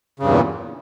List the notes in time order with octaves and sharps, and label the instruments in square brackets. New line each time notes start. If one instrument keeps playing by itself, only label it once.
[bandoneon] C#3
G2
E2
A#2